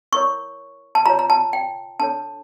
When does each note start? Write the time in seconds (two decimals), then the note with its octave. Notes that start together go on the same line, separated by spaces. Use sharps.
0.12 E4 A#4 C#5 C#6
0.95 A5
1.06 F4 C#5 A#5
1.19 A#5
1.30 A5
1.53 G5
2.00 D4 A4 C#5 A5